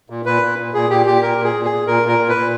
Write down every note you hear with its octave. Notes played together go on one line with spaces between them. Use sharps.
A#2
A#2 B4
A#2
A#2
A#2 G#4
A#2 G4
A#2 G4
A#2 A#4
A#2
G#4
A#2
G#4
A#2
A#2 A#4
A#2
A#4
A#2
B4
A#2